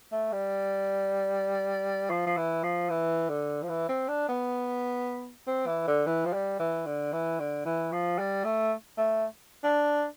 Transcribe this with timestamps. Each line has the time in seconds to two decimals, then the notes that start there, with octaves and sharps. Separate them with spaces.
0.12 A3
0.32 G3
2.10 F3
2.27 F3
2.37 E3
2.63 F3
2.90 E3
3.29 D3
3.63 F3
3.69 E3
3.88 C4
4.08 D4
4.28 B3
5.47 C4
5.67 E3
5.87 D3
6.06 E3
6.25 F3
6.33 G3
6.59 E3
6.86 D3
7.12 E3
7.39 D3
7.65 E3
7.92 F3
8.18 G3
8.44 A3
8.97 A3
9.64 D4